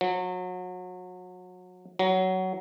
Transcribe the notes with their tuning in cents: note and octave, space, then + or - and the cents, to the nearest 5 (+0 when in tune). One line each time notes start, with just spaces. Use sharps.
F#3 -30
F#3 +15